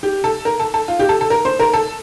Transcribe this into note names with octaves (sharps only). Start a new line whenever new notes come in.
G4
A4
A#4
A4
A4
F4
G4
A4
A4
A#4
C5
A#4
A4